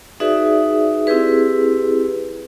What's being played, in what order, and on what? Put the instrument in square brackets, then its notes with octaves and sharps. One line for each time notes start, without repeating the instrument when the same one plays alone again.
[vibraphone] D#4 F#4 G#4 B4 D5 E5
C4 E4 G4 G#4 B4